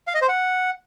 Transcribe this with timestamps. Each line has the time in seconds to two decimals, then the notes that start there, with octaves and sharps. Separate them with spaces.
0.07 F5
0.14 D#5
0.22 C5
0.29 F#5